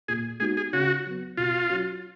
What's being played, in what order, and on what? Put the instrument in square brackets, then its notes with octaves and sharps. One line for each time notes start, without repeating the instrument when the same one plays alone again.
[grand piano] A#2 [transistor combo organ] G#4
[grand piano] G#3 B3 D#4 F#4 [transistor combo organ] G#4
[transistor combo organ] G#4
[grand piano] C#3 [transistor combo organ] F#4
[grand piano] F#3 B3
[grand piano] B2 [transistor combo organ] F4
[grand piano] F#3 C#4 F#4